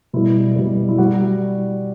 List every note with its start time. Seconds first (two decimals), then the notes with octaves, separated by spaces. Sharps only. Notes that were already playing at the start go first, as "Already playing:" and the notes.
0.13 B2 G3 E4
0.56 B2 G3
0.89 E4
0.98 G3 F#4